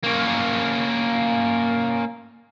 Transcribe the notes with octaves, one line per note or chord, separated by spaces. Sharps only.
A#3 C#4